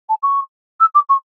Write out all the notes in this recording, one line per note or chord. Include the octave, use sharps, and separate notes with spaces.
A5
C#6
E6
D6
C#6